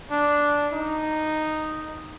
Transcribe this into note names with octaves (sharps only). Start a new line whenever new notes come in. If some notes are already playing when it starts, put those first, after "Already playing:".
D4
D#4